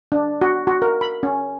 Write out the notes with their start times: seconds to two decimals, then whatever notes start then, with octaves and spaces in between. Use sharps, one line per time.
0.12 D4
0.41 F#4
0.67 F#4
0.82 A#4
1.01 B5
1.23 C#4